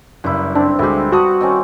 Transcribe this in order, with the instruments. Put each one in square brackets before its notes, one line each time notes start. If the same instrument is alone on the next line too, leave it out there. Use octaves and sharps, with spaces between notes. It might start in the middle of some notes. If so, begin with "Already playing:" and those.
[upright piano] F#1 [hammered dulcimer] G2 E4
[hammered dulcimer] C4 [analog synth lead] D4
[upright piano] D2 G#3 [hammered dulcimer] E4 G4
[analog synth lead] F#4 [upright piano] A5 D#6
[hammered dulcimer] D#3 C4 C#4